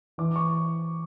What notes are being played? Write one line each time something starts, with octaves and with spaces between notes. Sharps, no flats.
E3 D6
C#6